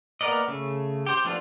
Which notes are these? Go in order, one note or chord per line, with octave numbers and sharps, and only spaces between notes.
A#3 B3 A#4 D5 D#5
C#3 A3
G4 C5
F3 A3 B3 D4 F4